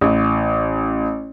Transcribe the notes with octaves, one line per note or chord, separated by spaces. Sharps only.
A1